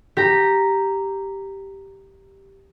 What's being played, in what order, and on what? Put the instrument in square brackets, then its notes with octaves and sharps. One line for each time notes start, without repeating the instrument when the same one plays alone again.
[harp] G4 A#5